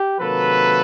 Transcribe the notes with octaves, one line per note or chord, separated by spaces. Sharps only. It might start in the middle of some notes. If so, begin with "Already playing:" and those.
Already playing: G4
C3 D#3 F#3 A#3 A4 B4